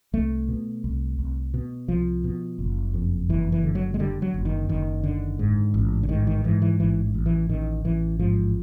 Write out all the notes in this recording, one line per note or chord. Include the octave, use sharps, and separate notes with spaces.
C2 A3
B2
C2
C2
B2
C2 F3
B2
F#1
F2
F#1 E3
E3
D3
F#3
G#3
D3 G3
F#3
F#1
D#3
F#1 D#3
D3
G#2
A1
D3
G#2 D#3
D#3
G#2 E3
E3
A1 E3
A1
E3
A1 D#3
A1 E3
G#2 F3